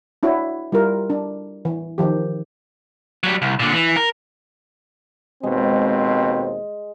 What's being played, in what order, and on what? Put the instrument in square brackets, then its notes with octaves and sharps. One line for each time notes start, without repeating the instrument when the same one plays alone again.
[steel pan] D4 E4 F#4 C#5
G3 E4 F4 A#4
D4
E3
D#3 F3 G4
[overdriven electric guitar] F#3 G3
C2
A#2 D3
E3
A#4
[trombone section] D#2 B2 C4 [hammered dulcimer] G#3